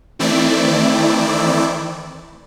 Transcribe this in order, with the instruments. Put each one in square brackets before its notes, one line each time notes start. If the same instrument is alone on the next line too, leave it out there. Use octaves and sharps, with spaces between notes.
[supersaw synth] D#3 E3 A3 C4 E4 D5